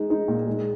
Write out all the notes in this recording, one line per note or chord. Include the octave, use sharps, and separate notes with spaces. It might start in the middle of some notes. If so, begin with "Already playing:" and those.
Already playing: G#3 D#4
D#4
A#2
G#3